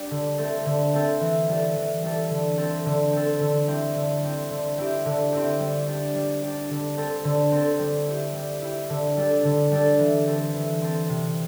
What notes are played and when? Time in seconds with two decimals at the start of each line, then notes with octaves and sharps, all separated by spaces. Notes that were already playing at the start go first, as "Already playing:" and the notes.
Already playing: G3 D4 G4
0.11 D3
0.38 A3 C4 A4
0.66 D3
0.93 A3 C4 A4
1.21 E3
1.48 G3 E4 A4
1.76 E3
2.03 G3 E4 A4
2.30 D3
2.58 C4 A4
2.86 D3
3.13 C4 A4
3.40 D3
3.67 G3 C4 E4
3.95 D3
4.23 G3 C4 E4
4.50 D3
4.78 C4 E4 G4
5.06 D3
5.33 C4 E4 G4
5.60 G3
5.87 D4 G4
6.15 G3
6.42 D4 G4
6.70 D3
6.97 C4 A4
7.24 D3
7.52 C4 A4
7.79 G3
8.07 E4 G4
8.35 G3
8.62 E4 G4
8.90 D3
9.17 G3 D4 A4
9.45 D3
9.72 G3 D4 A4
9.99 E3
10.27 C4 A4
10.54 E3
10.82 C4 A4
11.09 C3